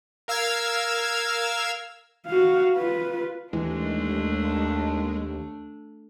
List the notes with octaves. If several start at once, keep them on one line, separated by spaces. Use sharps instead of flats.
A#4 F5 E6 F6 G#6
F#4 F5
F4 B4
D#2 E3 G#3 A3 D4